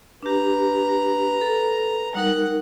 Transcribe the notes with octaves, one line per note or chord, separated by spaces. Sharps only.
D4 G4 B4 A#5
A4
G3 D#4 A#4 F#5